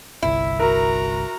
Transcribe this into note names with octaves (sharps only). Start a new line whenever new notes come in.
G1 C2 E4
F#4 A#4 A#5